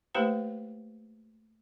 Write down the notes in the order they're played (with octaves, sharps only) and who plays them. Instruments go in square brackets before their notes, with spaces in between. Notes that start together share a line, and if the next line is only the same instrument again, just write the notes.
[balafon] A3 A#3 E4 G4 B4 C5